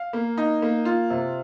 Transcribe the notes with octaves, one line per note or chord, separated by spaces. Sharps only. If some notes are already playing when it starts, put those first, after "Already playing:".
Already playing: F5
A#3
D#4
A#3
F4
C3